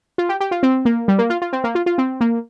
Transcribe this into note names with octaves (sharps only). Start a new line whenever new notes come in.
F4
G4
G4
F4
C4
A#3
G3
A#3
F4
F4
C4
A#3
F4
F4
C4
A#3